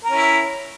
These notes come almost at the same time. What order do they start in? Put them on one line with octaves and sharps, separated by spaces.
A#4 C#4 E4